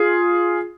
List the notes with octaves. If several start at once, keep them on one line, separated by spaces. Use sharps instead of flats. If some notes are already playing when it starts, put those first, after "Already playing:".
Already playing: F4 G#4